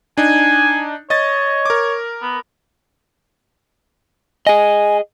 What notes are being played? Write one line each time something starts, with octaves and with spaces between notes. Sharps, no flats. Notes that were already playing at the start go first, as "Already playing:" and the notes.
D4 D#4 G#5
C#5 D#5 A6
A#4 D6
B3
G#4 D#5 G#5